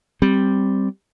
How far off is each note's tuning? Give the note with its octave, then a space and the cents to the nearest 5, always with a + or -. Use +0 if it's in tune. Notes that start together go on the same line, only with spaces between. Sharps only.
G3 +0 C4 +0